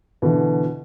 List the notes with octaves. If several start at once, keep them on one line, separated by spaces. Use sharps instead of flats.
B2 D3 E3